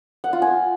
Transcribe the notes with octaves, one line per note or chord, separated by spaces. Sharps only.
F#5
F4
G#5